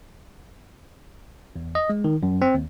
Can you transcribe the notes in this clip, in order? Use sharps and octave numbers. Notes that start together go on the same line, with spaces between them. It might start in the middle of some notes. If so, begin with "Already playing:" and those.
E2
D#5
G#3
D#3
F#2
C4
D#2